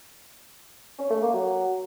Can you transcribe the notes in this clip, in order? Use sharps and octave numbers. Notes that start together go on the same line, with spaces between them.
C#4
A3
A#3
F#3